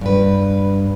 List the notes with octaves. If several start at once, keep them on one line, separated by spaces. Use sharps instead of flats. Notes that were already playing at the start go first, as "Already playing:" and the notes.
G2 B4